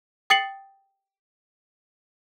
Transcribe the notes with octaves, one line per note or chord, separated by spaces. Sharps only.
G5 D#6 A6 C7 C#7 F#7